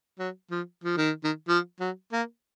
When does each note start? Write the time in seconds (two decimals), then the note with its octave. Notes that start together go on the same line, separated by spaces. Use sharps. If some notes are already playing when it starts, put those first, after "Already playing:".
0.19 F#3
0.51 F3
0.84 F3
0.97 D#3
1.24 D#3
1.48 F3
1.80 F#3
2.12 A#3